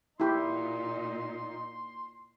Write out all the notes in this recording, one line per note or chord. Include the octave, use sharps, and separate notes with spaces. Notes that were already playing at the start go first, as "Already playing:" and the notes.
A#2 D#4 E4 G4 C6